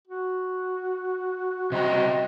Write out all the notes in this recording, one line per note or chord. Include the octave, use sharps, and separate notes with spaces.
F#4
C3 G3 D#5 A#5